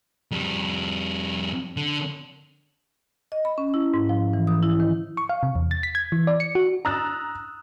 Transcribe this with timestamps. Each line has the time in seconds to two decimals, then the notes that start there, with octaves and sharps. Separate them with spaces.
0.31 F2 G3
1.77 D3
3.32 D#5
3.45 B5
3.58 C#4
3.74 E4
3.94 G#2
4.09 F3
4.33 E3
4.47 D#6
4.63 E4
4.80 D#3
5.17 C#6
5.29 F5
5.43 C3
5.56 E2
5.71 A6
5.83 B6
5.95 G#6
6.12 E3
6.27 D5
6.40 C#7
6.55 F#4
6.85 A#5 D#6 E6 F#6 A6